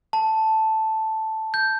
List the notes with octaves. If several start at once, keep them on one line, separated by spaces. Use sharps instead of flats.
A5
G6